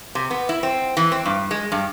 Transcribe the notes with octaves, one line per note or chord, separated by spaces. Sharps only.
C3
B3
E4
C4
E3
C4
G2
G#3
G2